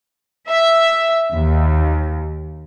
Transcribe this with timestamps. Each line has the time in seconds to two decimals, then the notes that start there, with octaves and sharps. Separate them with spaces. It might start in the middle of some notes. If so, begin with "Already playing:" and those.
0.49 E5
1.32 D#2